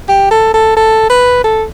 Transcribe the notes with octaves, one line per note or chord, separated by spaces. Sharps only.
G4
A4
A4
A4
B4
A4